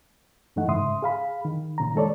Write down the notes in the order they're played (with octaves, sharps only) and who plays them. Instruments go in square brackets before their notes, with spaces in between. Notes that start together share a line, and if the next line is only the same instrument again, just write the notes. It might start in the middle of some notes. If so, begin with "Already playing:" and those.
[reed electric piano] G2 E3 A3 D#4 F#5
G#2 C#3 E5 C6 D#6
G#4 F5 B5
D#3
A#2 C#3 A#5
D#3 G#3 A4 C#5 D5